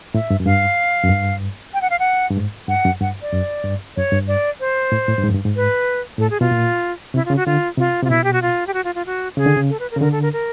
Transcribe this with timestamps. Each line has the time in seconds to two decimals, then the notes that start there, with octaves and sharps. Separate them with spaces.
0.14 A2 E5
0.30 G2
0.40 F#2
0.46 G2 F5
1.03 F#2
1.09 G2
1.74 G5
1.82 F#5
1.90 F5
1.99 F#5
2.31 G2
2.37 G#2
2.68 G2 F#5
2.85 F#2
3.01 G2 F#5
3.22 D5
3.32 F#2
3.64 G2
3.97 F#2 C#5
4.12 G2
4.28 D5
4.60 C5
4.92 A2
5.08 A2
5.17 G2
5.24 G#2
5.29 F#2
5.34 G2
5.44 G#2
5.56 B4
6.19 A2 A4
6.30 G#4
6.40 B2 F4
6.51 A#2
7.14 C3 E4
7.25 F4
7.30 C#3
7.36 F#4
7.46 D3 F4
7.78 C3 F4
8.02 C3 F4
8.10 B2 E4
8.24 G4
8.33 F#4
8.42 F4
8.67 G4
8.74 F#4
8.84 F4
8.95 F4
9.06 F#4
9.37 C#3 G#4
9.46 D3
9.56 C#3
9.70 A4
9.80 B4
9.91 A#4
9.96 C#3
10.01 D3 A#4
10.12 A4
10.22 A#4
10.33 A#4